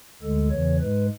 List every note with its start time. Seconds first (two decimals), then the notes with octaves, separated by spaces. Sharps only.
0.22 D2 D3 G#3 A4
0.51 E2 C#3 E3 C#5
0.80 G#2 G#3 B4